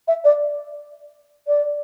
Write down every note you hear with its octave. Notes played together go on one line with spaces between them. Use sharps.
E5
D5
D5